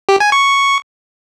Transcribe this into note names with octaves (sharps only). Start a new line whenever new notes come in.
G4
G#5
C#6